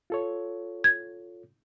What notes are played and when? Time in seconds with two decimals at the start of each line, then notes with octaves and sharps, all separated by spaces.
0.10 F4 A4 C#5
0.84 G#6